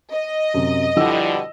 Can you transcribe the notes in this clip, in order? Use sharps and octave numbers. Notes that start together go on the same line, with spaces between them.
D#5
F#2 C3
B2 D3 F3 G3 E4 E6